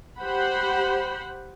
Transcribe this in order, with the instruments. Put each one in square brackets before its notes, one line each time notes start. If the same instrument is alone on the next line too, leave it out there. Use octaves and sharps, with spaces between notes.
[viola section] G4 C5 F#5 B5